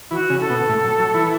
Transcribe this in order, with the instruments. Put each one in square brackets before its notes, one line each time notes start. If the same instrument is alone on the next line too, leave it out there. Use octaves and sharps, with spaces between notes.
[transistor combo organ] E3 E4 [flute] F#4
[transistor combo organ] C#3 C#4
[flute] A4
[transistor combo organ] B2 B3
A2 A3
F#3
F#3
E3 E4